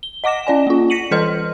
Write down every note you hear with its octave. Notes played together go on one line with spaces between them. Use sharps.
G7
D#5 F#5 D6 A#6 E7
C#4 D5 G#5
A#3 F4
A#6 B6 C#7 D#7 F#7
E3 A4 B4 D#5 C6 F6